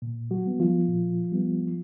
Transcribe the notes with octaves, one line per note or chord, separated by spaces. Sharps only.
A#2
F#3 F#4
G3 B3
F3 F4
A#2
G3 B3